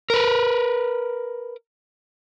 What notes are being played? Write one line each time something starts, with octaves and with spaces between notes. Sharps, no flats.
A#4 B4